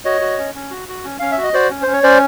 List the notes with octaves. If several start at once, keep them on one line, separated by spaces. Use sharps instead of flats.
F#4 C#5 D#5
F#4
C#4
C#4
F#4
F#4
C#4
C#4 F5
E5
F#4
D#5
F#4 C5 D5
C#4
C5
C#4
C#5
C#4 C5 D5